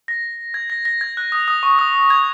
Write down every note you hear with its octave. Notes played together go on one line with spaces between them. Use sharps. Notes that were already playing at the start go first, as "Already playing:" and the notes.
A#6
G#6
A#6
A#6
G#6
F#6
D#6
D#6
C#6
D#6
G#6